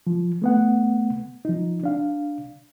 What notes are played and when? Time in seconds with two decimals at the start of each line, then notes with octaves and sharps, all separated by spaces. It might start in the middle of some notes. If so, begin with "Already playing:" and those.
0.07 F3
0.42 A3 B3 F#5
1.45 F3 D#4
1.84 D4 F5